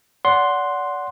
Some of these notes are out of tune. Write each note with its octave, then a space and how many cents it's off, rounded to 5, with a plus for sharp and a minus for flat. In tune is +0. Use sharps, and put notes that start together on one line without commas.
D5 -35 F#5 +0 C6 +0